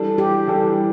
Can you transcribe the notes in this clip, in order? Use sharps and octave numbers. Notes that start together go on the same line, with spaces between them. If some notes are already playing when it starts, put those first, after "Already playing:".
Already playing: E3 G3 D4 A4
G4
E3 G3 D4 A4